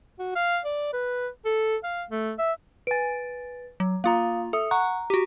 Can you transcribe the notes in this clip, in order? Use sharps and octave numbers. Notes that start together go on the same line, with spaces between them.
F#4
F5
D5
B4
A4
F5
A3
E5
B4 G#5 A6 D7
F#3
A#3 F4 F5 A#5 D#6
A4 E5 D#6
F#5 A#5 C#6 F#6
F#4 G4